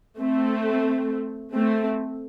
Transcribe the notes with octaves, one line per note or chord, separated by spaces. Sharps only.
A3 C4
A3 C4